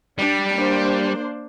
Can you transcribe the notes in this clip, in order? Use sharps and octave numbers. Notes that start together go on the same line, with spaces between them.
G3 D4
A#3 D4 C5